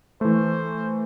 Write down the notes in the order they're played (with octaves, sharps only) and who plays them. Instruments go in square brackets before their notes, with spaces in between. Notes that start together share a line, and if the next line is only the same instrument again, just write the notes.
[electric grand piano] E3 A3 [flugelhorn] C5